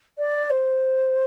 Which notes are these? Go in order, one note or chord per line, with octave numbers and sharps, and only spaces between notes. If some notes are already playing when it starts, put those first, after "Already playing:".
D5
C5